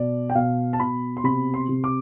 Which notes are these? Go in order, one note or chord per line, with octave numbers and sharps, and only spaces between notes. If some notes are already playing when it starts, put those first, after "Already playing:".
Already playing: B2 D5
G5
B2 F5
A5
B2 B5
C6
C3 B5
C6
C3
D6